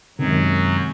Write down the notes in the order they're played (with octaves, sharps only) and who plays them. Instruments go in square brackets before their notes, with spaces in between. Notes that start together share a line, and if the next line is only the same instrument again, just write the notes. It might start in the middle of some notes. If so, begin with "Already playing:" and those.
[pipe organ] F#2 F#3 [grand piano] C3 D#3 G#3 C#4